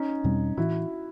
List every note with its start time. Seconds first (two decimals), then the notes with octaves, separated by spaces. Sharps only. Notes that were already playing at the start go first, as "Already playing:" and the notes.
Already playing: C#4 D#4
0.24 E2 B2 G3 C4
0.57 A2 E3 E4 F#4